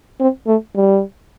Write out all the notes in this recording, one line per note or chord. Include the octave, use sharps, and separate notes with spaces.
C4
A3
G3